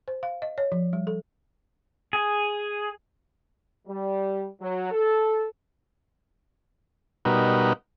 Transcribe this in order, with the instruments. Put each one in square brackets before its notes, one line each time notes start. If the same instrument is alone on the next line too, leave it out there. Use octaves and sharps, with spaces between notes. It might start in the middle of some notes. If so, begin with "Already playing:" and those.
[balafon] C5
F5
D#5
C#5
F3
G3
A4
[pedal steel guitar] G#4
[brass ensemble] G3
F#3
A4
[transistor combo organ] B2 G3 D#4 F#4 A#4 B4